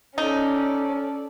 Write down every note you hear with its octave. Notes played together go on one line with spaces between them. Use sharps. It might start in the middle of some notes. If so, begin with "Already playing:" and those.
C#4 D#4 A4 D5